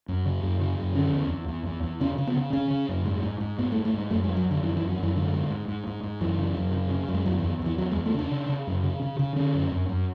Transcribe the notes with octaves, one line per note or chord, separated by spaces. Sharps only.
F#2
C#3
F#2
C#3
F#2
D3 C#4
E2
E2
E2
E2
E2
C#3 C#4
C#3
B3
C#3
C#3 C#4
C#3
F#2
G#2
G#2
G#2
G#2 B3
A3
G#2
A3
G#2 G#3
F#2 A3
G#3
F#2
F#3
F#2
D3
F#2 E3
E3
F#2
F#3
F#2 E3
G#2 D3
G#2
G#2
G#2
G#2
G#2
F#2 E3
C#3
F#2
C#3
C#3
F#2
G#3
E2 F#3
E3
E2
E2 E3
E2 F#3
G#3
E2
A3
C#3 D4
C#3
C#3
F#2
C#3
C#3
C#3
D3 C#4
F#2
F#2
F#2